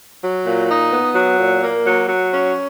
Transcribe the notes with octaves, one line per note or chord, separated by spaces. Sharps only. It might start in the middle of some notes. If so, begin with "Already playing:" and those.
F#3
A#2
D#4
B3
F#3
A#2
A#3
F#3
F#3
C#4